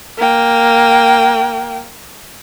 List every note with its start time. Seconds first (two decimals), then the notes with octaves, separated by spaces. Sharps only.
0.18 A#3 G5